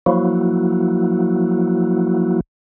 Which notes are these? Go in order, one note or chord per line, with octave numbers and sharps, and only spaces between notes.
F3 F#3 A#3 E4 F#4